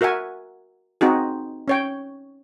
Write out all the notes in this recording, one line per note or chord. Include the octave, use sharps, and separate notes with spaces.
F#4 A#4 E5 F#5 G#5
C4 D#4 F#4 G#4
C#4 C#5 G5